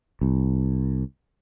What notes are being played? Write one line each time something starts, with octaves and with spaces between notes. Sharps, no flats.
C2